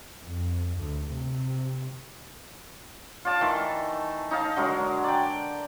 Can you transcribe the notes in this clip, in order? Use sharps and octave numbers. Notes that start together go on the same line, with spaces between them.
F2
D2
C3
F4 D5 A5
D#3 E3 A3
D#4 D#5 F5 A5
D3 F#3 G#3 A#4
D5 G5